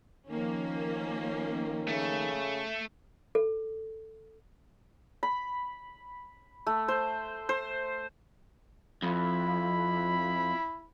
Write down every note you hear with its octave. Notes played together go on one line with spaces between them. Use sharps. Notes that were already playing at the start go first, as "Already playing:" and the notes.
D#3 F3 A#3 C#4
C#3 A3
A4
B5
A3
C5
C5
F2 E4 B5